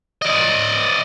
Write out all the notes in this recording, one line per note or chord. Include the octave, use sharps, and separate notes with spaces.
D5 D#5